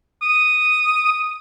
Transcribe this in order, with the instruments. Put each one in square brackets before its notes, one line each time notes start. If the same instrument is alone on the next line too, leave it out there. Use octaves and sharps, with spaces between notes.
[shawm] D#6